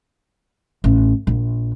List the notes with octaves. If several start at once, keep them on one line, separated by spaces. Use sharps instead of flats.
A1
A#1